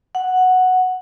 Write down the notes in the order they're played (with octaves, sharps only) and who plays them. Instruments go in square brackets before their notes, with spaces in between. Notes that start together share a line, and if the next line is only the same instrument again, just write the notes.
[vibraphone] F#5